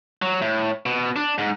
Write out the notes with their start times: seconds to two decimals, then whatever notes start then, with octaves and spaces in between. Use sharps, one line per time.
0.22 F#3
0.42 A2
0.86 B2
1.16 D4
1.38 G#2